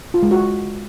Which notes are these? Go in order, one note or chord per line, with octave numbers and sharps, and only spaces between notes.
F4
G#3
F#4